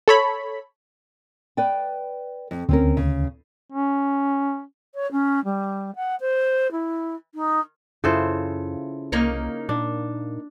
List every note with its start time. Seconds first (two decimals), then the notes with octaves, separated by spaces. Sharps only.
0.08 A4 C#5 B5
1.57 B4 D5 G5
2.51 F2
2.69 D2 C4 C#4 A#4
2.97 C#3
3.72 C#4
4.94 C#5
5.11 C#4
5.44 G3
5.95 F#5
6.20 C5
6.71 E4
7.34 D#4
8.04 F#2 C#3 E4 F4 A4 C5
9.12 C2 A#3 D#4 C#5
9.69 A#2 D4